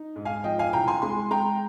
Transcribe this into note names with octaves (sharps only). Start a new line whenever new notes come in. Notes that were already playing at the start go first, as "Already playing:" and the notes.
Already playing: D#4
G#2
F5 G#5
F3 D#5 G5
F5 G#5
C2 G5 A#5
G#5 C6
G#3 G#5 C6
G#3 G5 A#5